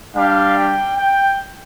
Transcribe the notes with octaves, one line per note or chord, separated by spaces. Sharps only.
G3 D4 G4 F5
G5
G5